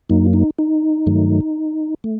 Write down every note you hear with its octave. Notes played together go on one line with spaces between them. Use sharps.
F#2 F#3 A#3 D#4
D#4
D#4
G2 D#3 F#3 A3
A3